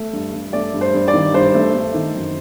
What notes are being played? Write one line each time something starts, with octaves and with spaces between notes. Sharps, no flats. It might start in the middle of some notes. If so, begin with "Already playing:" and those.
Already playing: A3
G2
G2
A3 D5
G2
C5
G2
D5
D#3
G2 C5
A3
A3
D#3
F#2